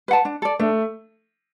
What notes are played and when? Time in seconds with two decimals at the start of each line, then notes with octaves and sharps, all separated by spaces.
0.08 B4 F#5 A5
0.25 D4
0.42 A4 D5
0.59 A3 D4